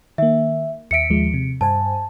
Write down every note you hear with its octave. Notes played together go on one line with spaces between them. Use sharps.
D#3 A#3 E5
D#2 E5 B6 C#7 D7
D#2 F3 G#3
C3
G2 C5 G#5 A5